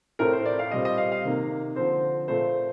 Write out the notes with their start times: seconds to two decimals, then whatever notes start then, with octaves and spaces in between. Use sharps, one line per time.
0.19 A2 A3 C4 A#4
0.33 C5
0.46 D5
0.59 F5
0.71 A#2 G3 C4 D#5
0.85 D#5
0.98 F5
1.12 F5
1.25 C3 D#3 A#3
1.76 D3 F3 C4 C5
2.28 A#2 A3 C4 C5